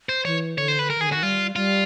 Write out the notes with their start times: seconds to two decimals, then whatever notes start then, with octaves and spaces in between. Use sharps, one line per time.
0.09 C5
0.25 E3 C#5
0.57 D3 C#5
0.68 C5
0.79 B4
0.90 A#4
0.98 D#3 G#4
1.07 D3
1.12 D#3 F#4
1.23 G3 F4
1.55 G3 F4